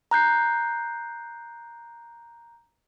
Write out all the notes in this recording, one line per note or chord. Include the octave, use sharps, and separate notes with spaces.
A#5 F#6 G6 C7